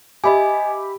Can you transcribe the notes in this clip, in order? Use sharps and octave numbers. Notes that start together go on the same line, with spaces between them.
G4 D#5 E5 G#5 B5